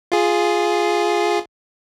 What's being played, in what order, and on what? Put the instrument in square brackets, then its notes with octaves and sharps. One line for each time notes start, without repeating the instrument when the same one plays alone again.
[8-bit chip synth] F4 G#4